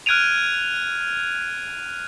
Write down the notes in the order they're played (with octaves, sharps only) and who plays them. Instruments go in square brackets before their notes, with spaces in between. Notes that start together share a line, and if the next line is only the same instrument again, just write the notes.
[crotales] F6 F#6 G#6 D7 D#7 F7